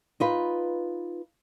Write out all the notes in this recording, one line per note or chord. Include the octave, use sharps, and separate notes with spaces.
D#4 F4 B4